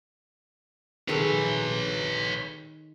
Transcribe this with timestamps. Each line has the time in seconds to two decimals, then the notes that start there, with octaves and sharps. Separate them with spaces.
1.08 D#3 G#4 A4 B4 C#5